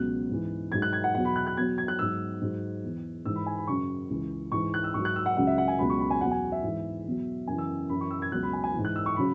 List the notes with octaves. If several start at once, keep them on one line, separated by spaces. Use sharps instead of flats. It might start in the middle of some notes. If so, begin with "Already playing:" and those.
Already playing: C#2 B2 F#3 F#6
G#2 E3
G#2 F#3 G#6
F#6
G#6
F#5
E2 B2 F#3 F#5
B5
F#6
F#6
E2 B2 F#3 G#6
G#6
F#6
G#2 F#3 E6
G#2 F#3
E2 E3
G#2 E3 E6
B5
G#5
B5
F#2 C#3 F#3 C#6
C#2 C#3 E3
G#2 E3 C#6
F#6
E6
G#2 F#3 C#6
F#6
E6
F#5
C#2 C#3 F#3 F#5
E5
F#5
G#5
C#2 B2 F#3 B5
C#6
B5
G#5
E2 B2 F#3 F#5
G#5
E5
G#2 E3
E2 B2 F#3
F#2 C#3 E3 G#5
E6
F#2 E3 B5
C#6
E6
G#6
C#2 B2 F#3 F#6
B5
G#5
G#5
G#2 E3
F#6
E6
C#6
C#3 F#3 B5